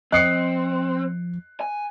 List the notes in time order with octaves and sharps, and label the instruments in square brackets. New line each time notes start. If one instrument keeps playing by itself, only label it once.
[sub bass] F3 [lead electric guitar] C4 [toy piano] D#5 G5 D#6 [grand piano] F#6 C7 C#7
[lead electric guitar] G#5